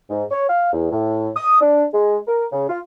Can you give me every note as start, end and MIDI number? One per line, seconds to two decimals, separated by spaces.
0.10 0.23 44
0.31 0.45 73
0.48 0.69 77
0.73 0.87 40
0.91 1.30 45
1.36 1.60 87
1.61 1.84 62
1.93 2.17 56
2.28 2.45 70
2.52 2.65 49
2.69 2.79 65